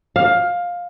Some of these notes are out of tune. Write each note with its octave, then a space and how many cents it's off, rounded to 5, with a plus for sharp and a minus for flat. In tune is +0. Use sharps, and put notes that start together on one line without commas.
F5 +15